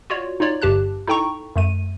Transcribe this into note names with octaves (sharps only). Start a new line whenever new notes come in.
F4 F#4 C#5 D5
D#4 F4 C#5 D5
G1 G2 G4 A5 F#6
D#4 E4 A4 G5 A#5 C#6
F#2 A3 D#7